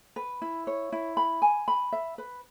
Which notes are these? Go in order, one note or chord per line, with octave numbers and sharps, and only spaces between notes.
B4
E4
C#5
E4
B5
G#5
B5
E5
B4